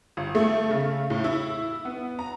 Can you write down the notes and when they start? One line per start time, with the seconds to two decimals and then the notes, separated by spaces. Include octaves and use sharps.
0.17 G1
0.35 A3
0.71 C#3
1.10 A2
1.24 E4
1.85 B3
2.19 A#5